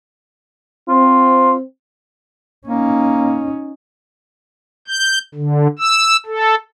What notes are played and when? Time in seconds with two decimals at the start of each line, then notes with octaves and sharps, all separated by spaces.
0.88 C4 F4
2.67 A#3 C#4 D#4
4.88 G6
5.35 D3
5.79 E6
6.26 A4